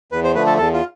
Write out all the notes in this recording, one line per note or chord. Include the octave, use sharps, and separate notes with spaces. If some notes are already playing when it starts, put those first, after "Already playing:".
E2 B4
C5
D3 F3 A3 B4
A4
E2 A4
F4